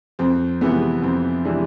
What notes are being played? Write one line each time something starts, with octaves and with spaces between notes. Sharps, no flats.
F2 C4
C3 E3 G#3 B3
F2 C4
C3 E3 G#3 D4